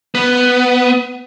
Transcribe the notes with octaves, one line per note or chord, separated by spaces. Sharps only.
B3